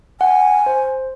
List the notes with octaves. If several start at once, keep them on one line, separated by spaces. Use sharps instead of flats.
F#5 G#5
C5